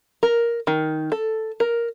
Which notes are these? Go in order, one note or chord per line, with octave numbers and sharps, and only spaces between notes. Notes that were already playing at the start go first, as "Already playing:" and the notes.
A#4
D#3
A4
A#4